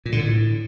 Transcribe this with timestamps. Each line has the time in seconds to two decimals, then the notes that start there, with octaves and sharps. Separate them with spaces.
0.05 A#2
0.12 D3
0.19 A2